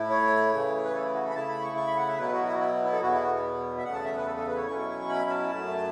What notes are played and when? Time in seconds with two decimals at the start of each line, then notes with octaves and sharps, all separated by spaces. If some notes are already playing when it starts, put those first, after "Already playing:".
Already playing: A2 A3 E4
0.10 C#5
0.52 C#3 E3 A3
0.85 B4
0.93 A4
1.03 E4
1.13 F#4
1.24 A4
1.30 B5
1.35 C#3 A3 E4 A5
1.49 B5
1.62 C#6
1.77 C#6
1.86 B5
1.97 F#5
2.08 E5
2.18 B2 F#3 B3 E4 B4
2.32 F#4
2.45 F#4
2.59 E4
2.84 E4
2.92 A4
3.01 E2 B2 B3 E4 F#4
3.12 E4
3.22 F#4
3.78 E5
3.84 E2 C#3 A3 F#5
3.94 A5
4.05 E5
4.16 B4
4.26 A4
4.36 A4
4.47 B4
4.57 C#5
4.67 B2 F#3 C#4 E4 C#6
5.09 B5
5.30 A5
5.51 F#2 F#3 A3